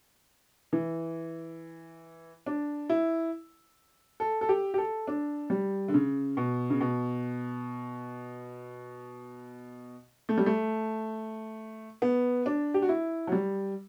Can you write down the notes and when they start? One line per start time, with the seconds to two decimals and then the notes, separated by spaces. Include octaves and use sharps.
0.73 E3
2.46 D4
2.90 E4
4.20 A4
4.41 A4
4.49 G4
4.74 G4
4.78 A4
5.07 D4
5.50 G3
5.88 D3
5.94 C#3
6.37 B2
6.70 C#3
6.81 B2
10.29 A3
10.38 G3
10.46 A3
12.02 B3
12.46 D4
12.74 G4
12.82 F#4
12.89 E4
13.27 F#3
13.32 G3